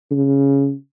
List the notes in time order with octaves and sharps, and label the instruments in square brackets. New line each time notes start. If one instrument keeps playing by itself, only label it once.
[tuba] C#3